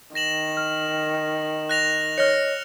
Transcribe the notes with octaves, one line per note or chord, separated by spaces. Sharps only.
D#3 A#6 E7 F#7
F6
F#6 A#6 F7
C#5 D#5 F6 A#6 C#7